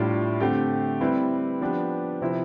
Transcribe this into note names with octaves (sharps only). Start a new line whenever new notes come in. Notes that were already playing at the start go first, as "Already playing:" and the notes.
Already playing: A2 G3 D4 F4
D3 A3 C4 G4
G3 C4 E4 B4
F3 B3 D4 G4 B4
C3 F3 C4 E4 B4